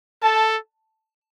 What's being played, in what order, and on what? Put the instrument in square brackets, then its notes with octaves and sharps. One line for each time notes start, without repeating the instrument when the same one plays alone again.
[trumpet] A4 [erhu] A5